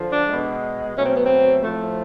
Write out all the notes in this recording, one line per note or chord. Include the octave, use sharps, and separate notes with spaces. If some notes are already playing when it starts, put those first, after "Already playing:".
Already playing: D3 F3
D4
B2 G#3
B2 F#3 A3 C#4
C4
B3
C4
A2 F3 A3